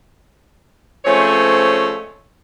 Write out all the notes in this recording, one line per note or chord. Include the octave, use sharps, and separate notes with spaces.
F3 G#3 A3 C4 C#4 C#5